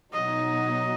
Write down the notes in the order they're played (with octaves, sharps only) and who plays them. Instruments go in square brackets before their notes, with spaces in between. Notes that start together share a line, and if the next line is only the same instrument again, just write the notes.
[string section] B2 F#3 D#4 F#4 [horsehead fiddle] D#5